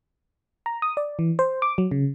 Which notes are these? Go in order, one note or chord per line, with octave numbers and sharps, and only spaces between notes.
A#5
D#6
D5
E3
C5
D6
F#3
C#3